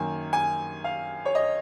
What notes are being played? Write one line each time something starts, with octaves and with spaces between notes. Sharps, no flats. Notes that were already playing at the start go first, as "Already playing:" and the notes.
Already playing: F#2 D#3 A#3 G#5
G#5
F5
C#5
D#5